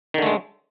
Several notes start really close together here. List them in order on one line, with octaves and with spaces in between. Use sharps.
D#3 D3 A3 G#3